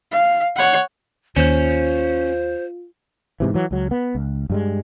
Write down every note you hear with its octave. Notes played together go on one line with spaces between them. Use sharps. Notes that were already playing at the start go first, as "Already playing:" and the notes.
F5
C#5 F#5
D#2 C#4 F4 C5
G#2 C3 E3
E3 F#3
C#2 F#3
B3
C#2
G2 G3 G#3